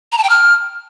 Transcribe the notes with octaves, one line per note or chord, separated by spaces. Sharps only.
A#5
A5
G5
F6